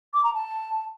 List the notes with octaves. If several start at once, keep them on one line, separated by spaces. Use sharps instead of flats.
D6
A#5
A5